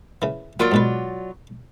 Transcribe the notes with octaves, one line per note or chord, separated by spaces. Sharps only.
C#3 E3
F#3 A#3 F4 D5 C#6
G#2 B2 B4